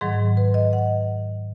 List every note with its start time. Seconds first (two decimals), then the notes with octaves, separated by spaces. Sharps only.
0.01 G#2 D#3 F#3 G#4
0.37 B4
0.54 D#5
0.73 F#5